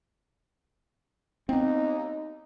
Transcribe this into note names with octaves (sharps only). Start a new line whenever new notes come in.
B3 C4 D#4